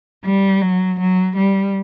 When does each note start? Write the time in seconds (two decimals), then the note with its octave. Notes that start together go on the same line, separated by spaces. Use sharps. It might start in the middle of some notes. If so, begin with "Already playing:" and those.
0.25 G3
0.62 F#3
1.00 F#3
1.37 G3